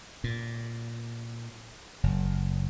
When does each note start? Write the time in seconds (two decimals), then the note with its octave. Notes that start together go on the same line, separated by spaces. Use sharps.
0.24 A#2
2.03 F#1